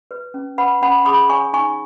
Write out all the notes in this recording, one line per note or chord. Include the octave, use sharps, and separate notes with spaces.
B4
C#4
B4 F#5 B5
C#4 F#5 B5
G#4 B5 D#6
C#5 G#5 C#6
D#4 G#5 C#6